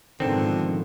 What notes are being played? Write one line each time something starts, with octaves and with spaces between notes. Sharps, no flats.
G#2 B2 D3 D#3 F3 C4